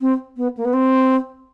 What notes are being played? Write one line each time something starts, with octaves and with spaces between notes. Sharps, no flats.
C4
B3
A#3
B3
C4